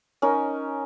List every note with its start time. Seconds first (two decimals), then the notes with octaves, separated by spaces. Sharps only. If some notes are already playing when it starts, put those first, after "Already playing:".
0.22 C#4 D#4 A#4